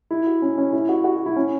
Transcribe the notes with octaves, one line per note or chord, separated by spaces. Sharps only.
E4
F#4
C#4
C#4
E4
F#4
F#4
F#4
E4
C#4